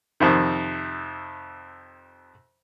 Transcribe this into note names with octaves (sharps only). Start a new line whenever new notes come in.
F2 C3 D#3